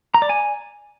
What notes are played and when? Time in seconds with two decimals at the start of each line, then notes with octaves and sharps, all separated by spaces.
0.14 A#5
0.22 D5
0.29 G#5